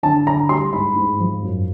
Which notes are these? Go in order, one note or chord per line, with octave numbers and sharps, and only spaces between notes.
D3 A5
D3 A#5
G3 C6
G#2 B5
G#2
F3
F#2